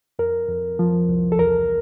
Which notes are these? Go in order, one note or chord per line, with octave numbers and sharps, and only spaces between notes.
F2 A#4
F2
F3
C2
A4
E2 A#4